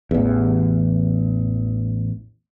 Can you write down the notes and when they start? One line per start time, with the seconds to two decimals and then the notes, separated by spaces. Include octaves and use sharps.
0.11 A1 E2